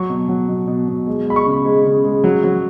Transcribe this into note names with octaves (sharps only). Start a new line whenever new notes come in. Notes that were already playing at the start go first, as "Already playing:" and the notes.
Already playing: F#3 C#6
B2
F#3
B2
B2
B2
G#3
G#3 B5
C#6
C#3
G#3
C#3
G#3
F#3
F#3